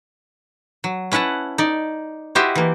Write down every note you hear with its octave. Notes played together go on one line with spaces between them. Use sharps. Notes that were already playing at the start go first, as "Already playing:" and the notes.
F#3
C#4 E4 B4 F#5 A5
D#4 D5
E4 F#4 G4 C5 D#5 E5
E3 A#3